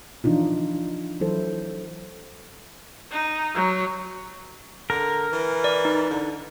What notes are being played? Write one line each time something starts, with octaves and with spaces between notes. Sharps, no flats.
E3 F3 D4 D#4 F4
E3 F#3 E4 A4 C5
D#4
F#3
D3 A#4
E3
D5
D#4
D3